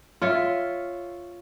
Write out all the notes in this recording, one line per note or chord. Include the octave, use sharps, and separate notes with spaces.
F4 C#5 E5